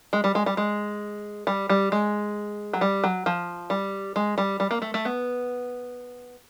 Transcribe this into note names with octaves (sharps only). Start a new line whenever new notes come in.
G#3
G3
G#3
G3
G#3
G3
G3
G#3
F#3
G3
F#3
F3
G3
G#3
G3
G3
A#3
A3
A3
B3